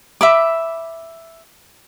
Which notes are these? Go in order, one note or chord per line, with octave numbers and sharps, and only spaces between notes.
E5 B5 D6